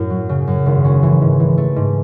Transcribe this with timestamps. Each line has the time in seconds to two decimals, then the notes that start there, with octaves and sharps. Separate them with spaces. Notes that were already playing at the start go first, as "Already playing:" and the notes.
Already playing: F#2 A2
0.10 F#3
0.29 C#3
0.47 F#2
0.66 G#1
0.84 C#4
1.03 E3
1.21 G#2
1.40 E3
1.58 A3
1.76 G#2